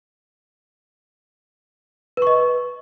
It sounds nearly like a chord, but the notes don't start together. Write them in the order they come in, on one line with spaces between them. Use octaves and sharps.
B4 C#6 D#5